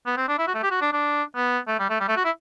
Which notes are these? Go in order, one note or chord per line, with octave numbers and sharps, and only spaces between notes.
B3
C4
D4
E4
F#4
A3
G4
F#4
D4
D4
B3
A3
G3
A3
G3
A3
F#4
E4